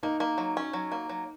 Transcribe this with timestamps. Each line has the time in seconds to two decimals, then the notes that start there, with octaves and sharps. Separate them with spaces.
0.03 A#3 D#4
0.20 A#3
0.38 F#3
0.57 C#4
0.73 F#3
0.92 A#3
1.09 F#3